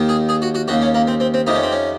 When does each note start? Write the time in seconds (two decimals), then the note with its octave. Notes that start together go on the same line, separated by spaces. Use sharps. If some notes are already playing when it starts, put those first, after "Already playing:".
Already playing: D#2 D#3
0.09 G#4
0.29 G#4
0.42 F#4
0.55 F#4
0.68 D#2 C#3 F#4
0.82 C#4
0.95 A#3
1.07 C4
1.20 C4
1.34 C4
1.47 F2 C3 D#3 D#4
1.55 C#4
1.63 C4
1.72 C#4